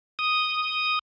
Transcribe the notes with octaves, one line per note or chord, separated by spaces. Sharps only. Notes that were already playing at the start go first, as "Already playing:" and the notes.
D#6